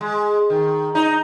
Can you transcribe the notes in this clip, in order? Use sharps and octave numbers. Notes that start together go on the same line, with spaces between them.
G#3
D#3
D#4